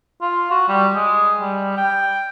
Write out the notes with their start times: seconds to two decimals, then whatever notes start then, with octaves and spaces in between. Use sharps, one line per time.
0.22 F4
0.51 F#4
0.68 G3
0.95 G#3
1.41 G3
1.77 G5